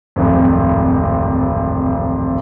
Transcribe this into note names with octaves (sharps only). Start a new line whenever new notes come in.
D1 G#1 F2